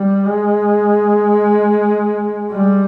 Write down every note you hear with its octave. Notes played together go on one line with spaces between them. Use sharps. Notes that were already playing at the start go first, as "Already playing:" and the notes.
Already playing: G3
G#3
G3